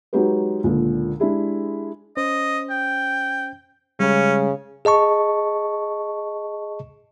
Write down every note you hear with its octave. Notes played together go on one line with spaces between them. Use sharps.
F#3 G#3 D#4 G4 B4
C#2 A#2 D3
G#3 D4 E4 G4 G#4
C#4 C5 D#5
G5
C#3 G3 G#3 C#4
G#4 D#5 A5 C#6